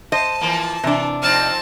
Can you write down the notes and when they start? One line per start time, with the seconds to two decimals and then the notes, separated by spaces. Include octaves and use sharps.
0.12 C5 D#5 A5
0.41 E3 F3 A#3
0.84 C3 E3 D4
1.23 F2 C4 D#4 A5 F6